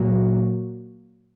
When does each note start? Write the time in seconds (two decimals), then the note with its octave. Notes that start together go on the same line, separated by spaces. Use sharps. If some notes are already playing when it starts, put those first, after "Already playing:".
Already playing: A#2 F#3 A#3 F#4